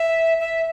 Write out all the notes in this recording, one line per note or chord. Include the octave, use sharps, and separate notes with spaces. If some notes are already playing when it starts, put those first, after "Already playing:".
Already playing: E5
E5